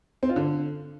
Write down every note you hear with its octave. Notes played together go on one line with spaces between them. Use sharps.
C4
F4
D3